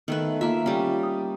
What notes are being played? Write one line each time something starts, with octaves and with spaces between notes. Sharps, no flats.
D#3 A3 B3 B4
A#3 F4 E5 F5
G3 C#4
D#6